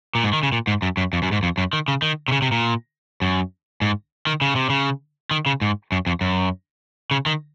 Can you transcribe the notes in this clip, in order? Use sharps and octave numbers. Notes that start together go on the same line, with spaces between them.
A#2
G#2
D#3
C#3
A#2
G#2
F#2
F#2
F2
F#2
G#2
F2
F#2
D#3
C#3
D#3
C3
C#3
C3
A#2
F#2
G#2
D#3
C#3
C3
C#3
D#3
C#3
G#2
F#2
F2
F#2
C#3
D#3